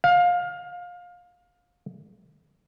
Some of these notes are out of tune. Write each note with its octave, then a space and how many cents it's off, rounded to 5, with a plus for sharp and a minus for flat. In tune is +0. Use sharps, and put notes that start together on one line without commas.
F5 +25